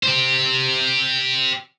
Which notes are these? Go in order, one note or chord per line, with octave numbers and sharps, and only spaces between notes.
G4 C5